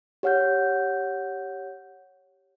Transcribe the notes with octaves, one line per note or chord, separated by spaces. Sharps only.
G4 C#5 F#5 F6 G6